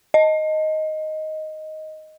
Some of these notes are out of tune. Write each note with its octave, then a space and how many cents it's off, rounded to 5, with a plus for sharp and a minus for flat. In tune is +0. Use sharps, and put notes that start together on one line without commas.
D#5 +5